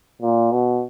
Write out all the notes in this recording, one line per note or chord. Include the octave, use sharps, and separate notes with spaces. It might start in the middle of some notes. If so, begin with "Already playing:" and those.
A#2
B2